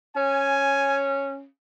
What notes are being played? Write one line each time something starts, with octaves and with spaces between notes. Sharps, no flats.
C#4 G#5